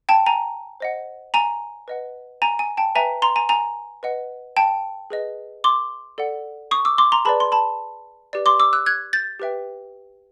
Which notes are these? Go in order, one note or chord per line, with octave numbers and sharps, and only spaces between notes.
G5 A5
G#5 A#5
C5 D#5 F#5
G#5 A#5
B4 D#5 F#5
G#5 A#5
G#5
G5 A5
B4 E5 G5 G#5 A#5
A#5 C6
G#5 A#5
G#5 A#5
B4 D#5 F#5
G5 A5
G#4 B4 D#5
C6 D6
A4 D5 F#5
C#6 D#6
D6 E6
C6 D6
A#5 C6
G#4 B4 D5 A5 B5
C6
A5 B5
G4 B4 D5
C6 D6
D6 E6
E6 F#6
F#6 G#6
G6 A6
G4 B4 E5 G5